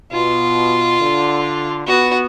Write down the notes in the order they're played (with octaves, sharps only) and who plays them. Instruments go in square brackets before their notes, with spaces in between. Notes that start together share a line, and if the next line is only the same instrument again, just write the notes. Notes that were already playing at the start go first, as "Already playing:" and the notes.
[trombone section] B2 [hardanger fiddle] F4
[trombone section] D3
[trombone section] B3 [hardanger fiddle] F#4